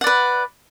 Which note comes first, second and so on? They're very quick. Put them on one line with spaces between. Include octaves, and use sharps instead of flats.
F#5 D5 B4